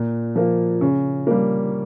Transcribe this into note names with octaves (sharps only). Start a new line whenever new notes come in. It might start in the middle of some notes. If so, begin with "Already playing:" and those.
Already playing: A#2
F3 A#3
C#3
G3 A#3